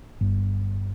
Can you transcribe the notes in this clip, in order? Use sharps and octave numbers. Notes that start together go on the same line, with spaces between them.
G1